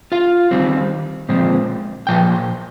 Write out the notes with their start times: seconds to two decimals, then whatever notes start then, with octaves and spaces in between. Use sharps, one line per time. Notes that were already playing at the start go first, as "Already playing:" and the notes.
0.12 F4 F5
0.51 D#3 G3 C4
1.29 A#2 F3 G#3 C4
2.07 A#2 F3 G5